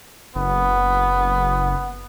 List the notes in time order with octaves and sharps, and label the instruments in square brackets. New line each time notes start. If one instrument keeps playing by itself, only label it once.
[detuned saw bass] F#1 [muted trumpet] B3